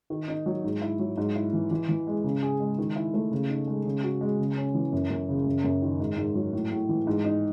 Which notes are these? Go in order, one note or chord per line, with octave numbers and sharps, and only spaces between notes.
D#3
D#4
F#3
G#2
E4
F#3
G#2
E4
E3
E3
E3
G#3
C#3
G#4
G#3
D#3
E4
A3
C#3
D#4
G#3
C#3
F#4
G#3
C#3
C#4
E3
F#2
F#2
C#3
F#2
F#2
D#3
G#2
G#2
F#3
A2
A2
E3
G#2
D#4